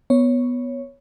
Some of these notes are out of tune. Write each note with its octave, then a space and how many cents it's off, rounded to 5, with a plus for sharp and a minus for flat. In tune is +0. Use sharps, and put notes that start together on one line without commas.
B3 +0 C#5 +0